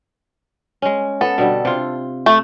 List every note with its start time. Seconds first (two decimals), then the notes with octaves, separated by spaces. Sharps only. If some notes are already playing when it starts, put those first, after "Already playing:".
0.82 G#3 C#4
1.21 B3 A4
1.38 B2 D3 G3
1.65 C3 F4
2.26 A3